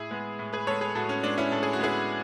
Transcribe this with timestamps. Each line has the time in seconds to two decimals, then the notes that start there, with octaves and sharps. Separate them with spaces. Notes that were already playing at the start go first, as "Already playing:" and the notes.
Already playing: A2 E4 G#4
0.11 G#3 B3
0.39 A2
0.53 G#4 B4
0.67 G#3 B3 A4 C#5
0.81 G#4 B4
0.95 A2 F#4 A4
1.09 C#4
1.23 G#3 B3 D4
1.38 C#4 E4
1.51 A2 A4
1.63 G#4
1.73 F#4
1.79 G#3 B3 E4 G#4